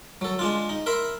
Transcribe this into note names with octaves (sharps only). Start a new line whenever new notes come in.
F#3 A4
G#3 D4 F4
D#4
A#4 E5 B5 C6